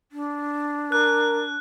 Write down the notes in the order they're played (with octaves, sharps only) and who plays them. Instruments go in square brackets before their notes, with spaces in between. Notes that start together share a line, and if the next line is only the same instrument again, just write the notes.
[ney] D4
[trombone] A#4 [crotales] F#6